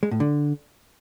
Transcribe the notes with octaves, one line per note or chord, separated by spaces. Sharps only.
G#3
A2
D3